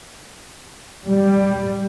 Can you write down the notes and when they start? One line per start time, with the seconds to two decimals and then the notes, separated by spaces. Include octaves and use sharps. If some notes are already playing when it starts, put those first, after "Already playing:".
1.05 G3